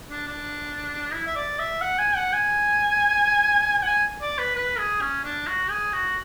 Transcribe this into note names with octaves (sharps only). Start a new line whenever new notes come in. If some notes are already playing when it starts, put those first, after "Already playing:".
D4
D4
E4
E5
D5
E5
F#5
G#5
F#5
G#5
F#5
G#5
D5
B4
B4
G#4
C#4
D4
F#4
G#4
F#4